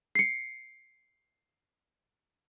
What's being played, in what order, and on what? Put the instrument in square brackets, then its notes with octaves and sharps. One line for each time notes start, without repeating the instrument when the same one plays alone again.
[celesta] C7 C#7